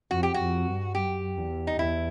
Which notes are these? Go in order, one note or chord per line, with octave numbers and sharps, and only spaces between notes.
F2 F#4
G4
F2 F#4
G2
F#2 G4
E2
D#4
E2 E4